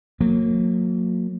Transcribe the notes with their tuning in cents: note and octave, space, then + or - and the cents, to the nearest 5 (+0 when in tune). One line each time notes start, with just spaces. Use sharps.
F#3 -35 A#3 -25